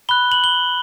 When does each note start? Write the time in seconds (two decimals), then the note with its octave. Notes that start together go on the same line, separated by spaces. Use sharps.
0.09 B5 F#6 G7
0.32 F#7
0.44 G7